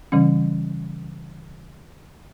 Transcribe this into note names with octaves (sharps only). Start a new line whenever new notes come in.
C#3 E3 G3 C#4